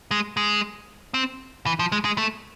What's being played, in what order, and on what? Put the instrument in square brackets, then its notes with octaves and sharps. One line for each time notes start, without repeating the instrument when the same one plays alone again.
[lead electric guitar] G#3
G#3
C4
E3
F3
G#3
G#3
A3